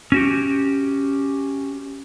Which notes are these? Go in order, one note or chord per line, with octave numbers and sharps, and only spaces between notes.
C#4 F#4 G4